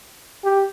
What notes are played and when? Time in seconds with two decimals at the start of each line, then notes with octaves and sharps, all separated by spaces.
0.43 G4